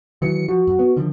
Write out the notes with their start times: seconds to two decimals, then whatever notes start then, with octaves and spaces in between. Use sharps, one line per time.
0.22 D#3 E3 F#3 C#7
0.49 F3 F#4
0.67 F#2
0.79 B3
0.97 D3 D#3 F3